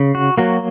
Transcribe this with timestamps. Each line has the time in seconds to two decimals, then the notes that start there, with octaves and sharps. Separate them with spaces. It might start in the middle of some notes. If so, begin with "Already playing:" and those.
Already playing: C#3
0.15 F#4
0.38 F#3 A#3 F#4